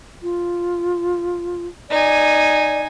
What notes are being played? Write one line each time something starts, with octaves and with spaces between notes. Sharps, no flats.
F4
D#4 D5 G#5